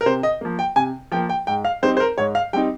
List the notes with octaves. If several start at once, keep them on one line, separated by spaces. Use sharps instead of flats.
A#4
C3 C5
D#5
F3 A#3
G5
C3 G#5
F3 A#3 G5
G5
G#2 G5
F5
G3 C4 D#4 C5
C5
A#4
G#2 C#5
F5
G3 C4 D#4 G5